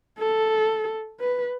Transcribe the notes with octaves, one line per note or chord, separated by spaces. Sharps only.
A4
B4